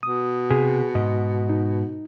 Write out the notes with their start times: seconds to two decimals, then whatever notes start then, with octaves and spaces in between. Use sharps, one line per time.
0.03 B2 D#6
0.51 C3 G#4
0.95 G#2 D#5
1.49 D#4